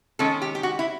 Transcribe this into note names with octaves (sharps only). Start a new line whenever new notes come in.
D#3 G#3 C#4 A4
G4
G4
F#4
E4